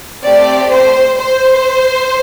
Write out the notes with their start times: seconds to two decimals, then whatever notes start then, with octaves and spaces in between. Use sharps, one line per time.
0.24 A3 C4 G4 D5
0.71 C5
1.17 C5